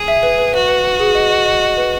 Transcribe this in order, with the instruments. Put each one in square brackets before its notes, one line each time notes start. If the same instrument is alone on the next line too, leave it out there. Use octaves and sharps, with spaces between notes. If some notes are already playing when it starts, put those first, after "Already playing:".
Already playing: [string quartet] G#4
[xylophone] E5
B4
B4
[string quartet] F#4 [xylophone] B4
[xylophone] B4
B4
G#4
D#5
D#5
D#5
D#5
B4